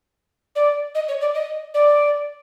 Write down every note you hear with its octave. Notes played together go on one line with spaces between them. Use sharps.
D5
D#5
C#5
D5
D#5
D5